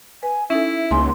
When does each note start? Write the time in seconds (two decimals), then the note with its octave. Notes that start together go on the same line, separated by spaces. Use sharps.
0.23 B4 G#5
0.50 C#4 D#4 E4 A4 E5
0.91 C#2 A#3 D#4 G#5 C6